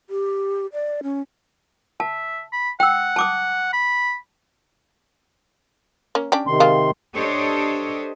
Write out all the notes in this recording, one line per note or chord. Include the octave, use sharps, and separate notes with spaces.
G4
D5
C#4
E5 A5
B5
F#5 G5 E6
A5 D6 D#6
B5
A#3 C#4
C#4 D4 G4
C3 D#3 C6
G#3 A#3 F4
D4 G4 A4 C5 C#5 D#5